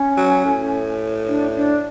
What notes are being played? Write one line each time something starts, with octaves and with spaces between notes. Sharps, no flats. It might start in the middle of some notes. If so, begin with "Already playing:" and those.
Already playing: C#4
F#3
A2
D4
D4